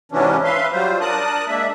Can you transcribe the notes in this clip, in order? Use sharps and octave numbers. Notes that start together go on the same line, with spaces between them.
G#2 C3 E3 F#3 C#4 D4
B4 E5 F5 C6
F#3 G3 F4 C5
D4 A#4 A5 D#6 F#6
G#3 A#3 D4 E5